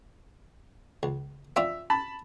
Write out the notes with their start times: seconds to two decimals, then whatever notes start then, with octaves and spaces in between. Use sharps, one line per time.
1.03 C#2
1.56 C4 D4 F4 E5
1.90 A5 B5